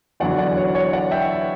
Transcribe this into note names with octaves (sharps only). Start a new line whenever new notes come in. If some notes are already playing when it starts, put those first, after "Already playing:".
E2 D3 F#3 D5 F#5
D5 F#5
C#5
C#5
D5 F#5
E5 G5